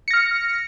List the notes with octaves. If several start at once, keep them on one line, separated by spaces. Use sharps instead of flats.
F6 A#6 C#7